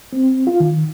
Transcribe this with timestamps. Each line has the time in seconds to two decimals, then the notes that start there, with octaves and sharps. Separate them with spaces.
0.13 C4
0.47 F4
0.60 D#3